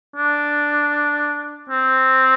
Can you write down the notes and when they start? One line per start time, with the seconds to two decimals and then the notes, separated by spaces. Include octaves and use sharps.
0.16 D4
1.70 C4